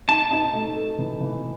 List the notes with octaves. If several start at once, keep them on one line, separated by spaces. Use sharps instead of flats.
D#4 A5
D#4
A3
A4
E3
E3